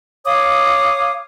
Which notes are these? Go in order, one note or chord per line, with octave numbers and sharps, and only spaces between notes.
C#5 F5 D6 D#6